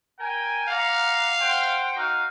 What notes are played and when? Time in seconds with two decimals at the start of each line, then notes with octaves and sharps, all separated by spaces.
0.19 A#4 G5 G#5
0.69 D5 F5 F#5 A#5
1.40 C5 F#5 G5
1.96 D#4 F#4 F5